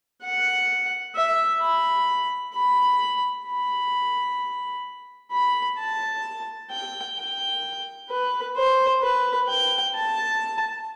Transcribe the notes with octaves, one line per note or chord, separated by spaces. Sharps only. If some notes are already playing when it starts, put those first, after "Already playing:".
F#5
E5
B5
B5
B5
B5
A5
G5
G5
B4
C5
B4
G5
A5